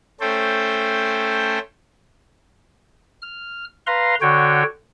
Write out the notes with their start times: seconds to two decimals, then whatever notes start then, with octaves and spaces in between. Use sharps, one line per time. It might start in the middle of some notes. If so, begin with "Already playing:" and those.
0.20 A3 C#4 A4 C5 G5
3.22 F6
3.87 B4 F5 A#5 C6
4.21 D3 F#4 C#5 G5